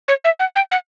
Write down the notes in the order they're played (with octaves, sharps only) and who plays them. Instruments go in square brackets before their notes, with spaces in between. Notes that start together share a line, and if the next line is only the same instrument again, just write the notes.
[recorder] C#5
E5
F#5
G5
F#5